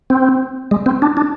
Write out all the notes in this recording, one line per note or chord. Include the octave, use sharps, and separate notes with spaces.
C4
G#3
C4
D4
D4